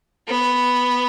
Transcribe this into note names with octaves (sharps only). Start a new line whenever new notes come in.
B3